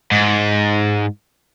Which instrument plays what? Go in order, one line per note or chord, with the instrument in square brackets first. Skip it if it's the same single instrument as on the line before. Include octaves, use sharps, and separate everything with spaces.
[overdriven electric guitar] G#2